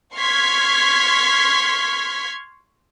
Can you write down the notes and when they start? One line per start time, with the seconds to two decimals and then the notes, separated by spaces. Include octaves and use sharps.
0.15 C6 C#6 F6 G#6 B6